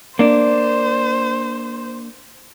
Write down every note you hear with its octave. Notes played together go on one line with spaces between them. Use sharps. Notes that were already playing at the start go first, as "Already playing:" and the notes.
A#3 D4 C5